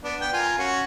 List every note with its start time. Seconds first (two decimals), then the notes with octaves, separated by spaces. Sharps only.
0.04 B3 D4
0.21 B3 G5
0.33 F4 A#4 G#5
0.58 C#4 F#4